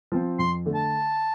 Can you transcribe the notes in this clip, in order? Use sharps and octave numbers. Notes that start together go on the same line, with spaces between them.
F3 C4
F2 C6
D3 A3
A5